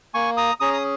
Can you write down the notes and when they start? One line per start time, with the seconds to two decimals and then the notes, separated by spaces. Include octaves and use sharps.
0.14 A#3 G#5 C#6
0.37 A#5 D#6
0.60 C#4 G#4 A#5 D#6
0.73 D#6